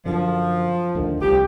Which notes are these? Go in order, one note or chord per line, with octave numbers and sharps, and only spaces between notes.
F#2 D3 F3
D2 D3 D#3
C2 F3 G4